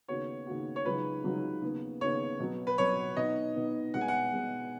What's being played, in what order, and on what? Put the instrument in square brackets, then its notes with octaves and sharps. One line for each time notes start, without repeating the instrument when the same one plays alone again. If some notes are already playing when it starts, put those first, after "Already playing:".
[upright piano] D#2 C#3 B3 F#4 [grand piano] C#5
[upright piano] D#2 C#3 B3 F#4
[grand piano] C#5
[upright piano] C#2 C#3 F#3 D#4 F#4 [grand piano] B4
[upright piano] C#2 C#3 F#3 D#4 F#4
D#2 C#3 B3
[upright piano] D#2 C#3 B3 [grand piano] C#5
[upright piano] B2 F#3 B3
[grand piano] B4
[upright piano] B2 F#3 B3 [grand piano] C#5
[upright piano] B2 B3 D#4 [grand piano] D#5
[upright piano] B2 B3 D#4
[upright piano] B2 G#3 B3 [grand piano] F#5
[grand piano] G#5
F#5
[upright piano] B2 G#3 B3